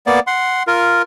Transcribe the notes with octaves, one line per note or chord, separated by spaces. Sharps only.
A#3 B3 D5
F#5 C6
F4 A#4